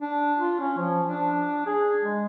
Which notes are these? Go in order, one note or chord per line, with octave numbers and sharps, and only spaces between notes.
D4
F4
C#4
F3
D4
G#4
G#3